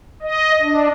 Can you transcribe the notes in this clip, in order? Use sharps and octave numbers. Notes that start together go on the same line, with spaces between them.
D#5
D4